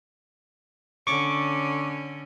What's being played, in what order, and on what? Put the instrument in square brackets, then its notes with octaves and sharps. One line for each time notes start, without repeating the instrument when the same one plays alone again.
[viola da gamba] D3 C#4 [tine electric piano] C#6 D6